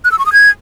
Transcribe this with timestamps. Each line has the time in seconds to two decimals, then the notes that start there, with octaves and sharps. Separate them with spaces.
0.04 F#6
0.11 E6
0.19 C#6
0.26 D#6
0.33 G#6